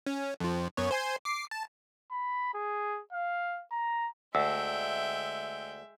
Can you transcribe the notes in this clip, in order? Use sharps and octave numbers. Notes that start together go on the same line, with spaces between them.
C#4
F2 F3
F#2 B3 C#5
C5 G#5 C6
D6 C7
A5
B5
G#4
F5
A#5
D2 G#3 E5 G5 E6